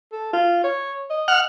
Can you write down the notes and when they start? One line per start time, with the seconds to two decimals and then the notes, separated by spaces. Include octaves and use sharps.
0.12 A4
0.33 F4
0.64 C#5
1.10 D#5
1.28 F#5 F6